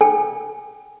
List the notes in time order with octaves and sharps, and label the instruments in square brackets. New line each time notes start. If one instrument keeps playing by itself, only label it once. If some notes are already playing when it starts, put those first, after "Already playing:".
[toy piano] A4 G5 G#5